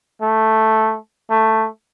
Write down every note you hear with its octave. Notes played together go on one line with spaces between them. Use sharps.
A3
A3